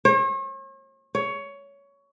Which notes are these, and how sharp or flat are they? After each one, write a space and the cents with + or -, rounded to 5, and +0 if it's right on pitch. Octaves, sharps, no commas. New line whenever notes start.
C#5 -45
C#5 +15